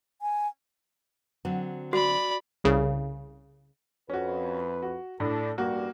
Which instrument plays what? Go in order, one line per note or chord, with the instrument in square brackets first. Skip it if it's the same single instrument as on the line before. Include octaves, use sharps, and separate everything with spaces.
[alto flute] G#5
[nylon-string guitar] D3 F#3 C4
[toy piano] F#4 [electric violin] D5 B5
[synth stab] C2 C#3
[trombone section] F2 B4 [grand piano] C#4 F#4
[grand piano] F#4
[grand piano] A2 [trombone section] D4 A4
[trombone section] A1 G2 G3 [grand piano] A#3 F#4